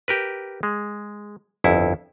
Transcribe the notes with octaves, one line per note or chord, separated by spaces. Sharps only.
G4 A#4 B4
G#3
G1 F2 E4